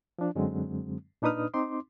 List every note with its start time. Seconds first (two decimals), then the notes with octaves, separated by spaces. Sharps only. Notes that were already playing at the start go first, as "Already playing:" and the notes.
0.19 F3 D4
0.35 F#2 D3 F#3 G#3 C4
1.22 A#2 D4 D#4 B4 D#6 F6
1.54 C4 D#4 C6 D6